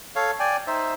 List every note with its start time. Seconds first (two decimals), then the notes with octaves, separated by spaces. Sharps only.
0.16 A4 C#5 F5
0.40 D5 G5 G#5
0.67 D#4 C5 E5